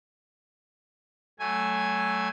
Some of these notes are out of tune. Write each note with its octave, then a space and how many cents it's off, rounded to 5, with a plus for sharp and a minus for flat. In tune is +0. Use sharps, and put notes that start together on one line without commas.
F#3 +30 A3 -5 G#5 +0